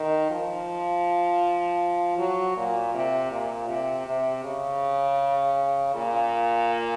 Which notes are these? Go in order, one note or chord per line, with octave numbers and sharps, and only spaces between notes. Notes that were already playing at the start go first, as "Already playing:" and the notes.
Already playing: D#3
F3
F#3
A#2
C3
A#2
C3
C3
C#3
A#2